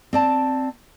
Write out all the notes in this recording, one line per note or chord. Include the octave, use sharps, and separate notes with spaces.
C4 D5 A5